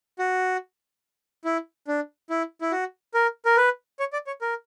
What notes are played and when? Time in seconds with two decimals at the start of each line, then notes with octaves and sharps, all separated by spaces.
0.19 F#4
1.45 E4
1.88 D4
2.30 E4
2.61 E4
2.72 F#4
3.14 A#4
3.45 A#4
3.57 B4
3.99 C#5
4.13 D5
4.27 C#5
4.41 A#4